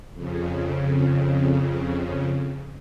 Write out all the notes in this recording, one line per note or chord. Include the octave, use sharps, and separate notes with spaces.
F2 C#3